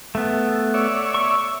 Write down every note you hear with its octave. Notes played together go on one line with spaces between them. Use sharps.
A3 B3
C#5 D5 E5
C#6